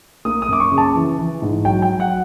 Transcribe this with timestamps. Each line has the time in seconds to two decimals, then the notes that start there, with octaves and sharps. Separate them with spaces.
0.25 A#3 D#6
0.42 D#6
0.48 F#2 D6
0.60 C#6
0.72 C#3
0.78 A5
0.95 E3
1.18 E3
1.42 G#2
1.65 F#3 G5
1.82 G5
1.88 F#3
2.00 F#5